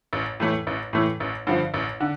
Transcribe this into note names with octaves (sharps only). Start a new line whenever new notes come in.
A1
A2 E3 A3
A1
A2 E3 A3
A1
G2 D3 F3
A1
D3